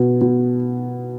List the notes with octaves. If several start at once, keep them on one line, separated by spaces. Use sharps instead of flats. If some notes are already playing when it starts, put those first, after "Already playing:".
Already playing: B2 B3
B2